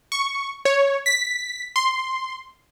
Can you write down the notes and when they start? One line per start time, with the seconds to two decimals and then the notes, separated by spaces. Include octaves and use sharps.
0.12 C#6
0.65 C#5
1.06 B6
1.76 C6